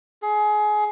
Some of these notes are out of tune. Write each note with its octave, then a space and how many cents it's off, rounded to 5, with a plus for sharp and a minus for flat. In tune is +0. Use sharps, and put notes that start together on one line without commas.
G#4 +25